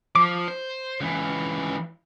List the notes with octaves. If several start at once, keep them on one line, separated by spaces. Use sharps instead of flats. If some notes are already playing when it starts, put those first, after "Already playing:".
F3 D6
C5
C#2 E3